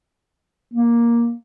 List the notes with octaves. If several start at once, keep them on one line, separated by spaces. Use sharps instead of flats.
A#3